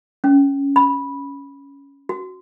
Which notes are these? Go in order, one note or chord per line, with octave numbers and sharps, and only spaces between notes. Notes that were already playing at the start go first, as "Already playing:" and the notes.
C#4
B5
F#4